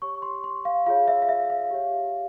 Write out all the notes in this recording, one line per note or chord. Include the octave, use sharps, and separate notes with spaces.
G4 C#5 C#6
C6
C6
F5
F4 G#4 C#5 F5
E5
F5
E5
F5
G4 C#5